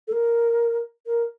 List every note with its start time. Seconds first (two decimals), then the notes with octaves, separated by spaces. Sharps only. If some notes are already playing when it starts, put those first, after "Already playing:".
0.08 A4
0.12 A#4
1.06 A#4